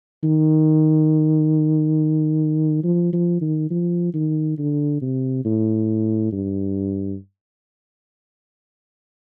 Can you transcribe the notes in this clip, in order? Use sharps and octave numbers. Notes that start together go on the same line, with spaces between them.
D#3
F3
F3
D#3
F3
D#3
D3
C3
A2
G2